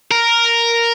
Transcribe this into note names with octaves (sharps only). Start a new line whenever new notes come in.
A#4